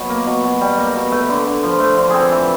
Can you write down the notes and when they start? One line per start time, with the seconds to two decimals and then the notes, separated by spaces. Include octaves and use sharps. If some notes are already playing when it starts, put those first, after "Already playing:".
Already playing: B2 F#3
0.10 A#3
0.26 B2
0.44 B2
0.61 G3
0.78 A#3
0.87 A#4
0.95 B2
1.12 A3 B4
1.29 D3
1.46 D3
1.63 F3
1.80 A3
1.97 D3
2.10 C4 G#4 A4
2.32 E3